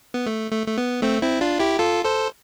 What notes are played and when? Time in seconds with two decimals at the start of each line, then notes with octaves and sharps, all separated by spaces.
0.14 B3
0.26 A3
0.52 A3
0.67 A3
0.78 B3
1.02 A3 C4
1.21 C4 E4
1.41 D4 F4
1.59 E4 G4
1.79 F4 A4
2.04 A4 C5